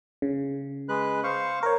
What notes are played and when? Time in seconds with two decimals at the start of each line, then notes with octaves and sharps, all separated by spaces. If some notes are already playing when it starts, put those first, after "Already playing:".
0.22 C#3
0.89 G#3 B4 F#6
1.24 C5 F5 C#6
1.63 A#4 C#5